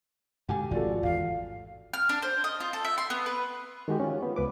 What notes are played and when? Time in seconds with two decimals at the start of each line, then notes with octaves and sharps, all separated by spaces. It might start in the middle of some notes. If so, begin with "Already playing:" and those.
0.48 G#2 B2 D3 G4 F#5 G#5
0.71 G#1 F2 A2 F4 F#4 A4 D5
1.03 G#1 E2 F5
1.93 F6
2.09 D4
2.22 C5
2.44 D#5
2.60 F4
2.73 A4
2.85 E5
2.98 C6
3.10 B3
3.26 B4
3.88 D#3 G#3 F#4 G4
4.00 C#4 F4
4.23 B3
4.36 C#2 B4 D6